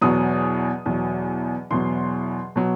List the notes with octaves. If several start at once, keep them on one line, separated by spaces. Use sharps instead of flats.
E2 B2 F#3 D#6
E2 B2 F#3
E2 B2 F#3 C6
B2 F#3